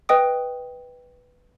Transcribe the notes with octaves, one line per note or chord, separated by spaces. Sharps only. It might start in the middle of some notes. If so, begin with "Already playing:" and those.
B4 D#5 G5 D#6